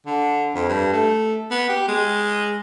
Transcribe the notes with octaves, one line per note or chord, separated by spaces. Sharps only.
D3
F2
G2
A3
B3
G4
G#3